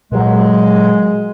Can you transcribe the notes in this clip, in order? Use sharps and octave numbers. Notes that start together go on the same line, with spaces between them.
A#2 F#3 G#3